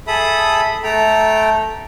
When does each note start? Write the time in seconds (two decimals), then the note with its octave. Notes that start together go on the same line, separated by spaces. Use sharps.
0.07 G#4 A4 E5 B5 D#6
0.83 A3 A4 G5 A#5